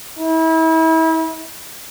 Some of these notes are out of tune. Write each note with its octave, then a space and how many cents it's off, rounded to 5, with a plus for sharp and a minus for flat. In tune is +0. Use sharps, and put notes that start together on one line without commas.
E4 -35